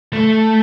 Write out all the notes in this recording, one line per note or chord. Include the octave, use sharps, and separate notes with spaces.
A3